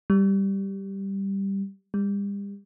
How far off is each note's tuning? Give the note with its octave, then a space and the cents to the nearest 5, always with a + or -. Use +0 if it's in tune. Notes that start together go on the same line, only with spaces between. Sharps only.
G3 +0
G3 +40